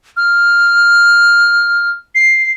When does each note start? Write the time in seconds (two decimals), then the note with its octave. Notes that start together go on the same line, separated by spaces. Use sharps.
0.17 F6
2.15 C7